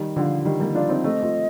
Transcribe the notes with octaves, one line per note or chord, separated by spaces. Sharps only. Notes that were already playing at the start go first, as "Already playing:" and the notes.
Already playing: D#3 G3
D3 F3 G5
F5
D#3 G3
G3 A#3
D4 F4 D5
C4 D#4
A3 C4 D#5
F3 A3